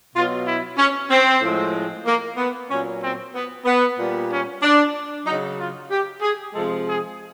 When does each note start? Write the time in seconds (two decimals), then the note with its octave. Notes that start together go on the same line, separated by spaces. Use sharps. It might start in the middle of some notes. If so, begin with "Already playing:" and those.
0.14 B2 F#3 F4
0.46 E4
0.77 C#4
1.10 C4
1.41 A2 F3 G#3
2.05 A#3
2.37 B3
2.69 A#2 F#3 C#4
3.02 C4
3.34 B3
3.65 B3
3.97 A#2 G3
4.30 C#4
4.62 D4
5.25 F#3 D#4
5.30 C#3
5.58 F4
5.90 G4
6.21 G#4
6.54 C3 F3 G#3 A4
6.86 G#4